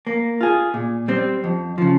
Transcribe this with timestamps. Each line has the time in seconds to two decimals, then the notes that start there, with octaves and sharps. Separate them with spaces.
0.07 A#3
0.41 F4 G#4
0.74 A#2
1.08 G3 C4
1.44 F2
1.78 C#3 F3